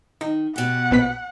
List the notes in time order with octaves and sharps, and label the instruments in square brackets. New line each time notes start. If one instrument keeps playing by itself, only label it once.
[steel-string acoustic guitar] D#3 [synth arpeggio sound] D#4
[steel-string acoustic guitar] B2 G4 [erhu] F#5
[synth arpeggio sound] A#1 B3 B6